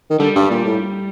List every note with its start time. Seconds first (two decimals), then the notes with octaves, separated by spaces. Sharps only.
0.10 D#3
0.19 D3 G3
0.35 G2
0.50 A#2
0.65 A2